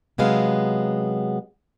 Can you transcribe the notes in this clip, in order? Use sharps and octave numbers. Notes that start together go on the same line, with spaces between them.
C3 F#3 G#3 B3 F5